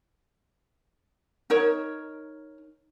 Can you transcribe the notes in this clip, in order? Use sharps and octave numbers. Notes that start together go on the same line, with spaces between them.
D#4 A#4 C#5